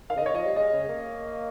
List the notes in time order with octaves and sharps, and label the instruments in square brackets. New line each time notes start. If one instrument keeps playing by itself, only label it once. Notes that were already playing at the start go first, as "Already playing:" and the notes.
[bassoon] D#3 [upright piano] F5
[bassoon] C#3 [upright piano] D#5
[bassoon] D#3 [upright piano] C#5
[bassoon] F3 [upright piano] D#5
[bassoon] G3
[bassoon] G#3 [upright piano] D#5
[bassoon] C#3
A#3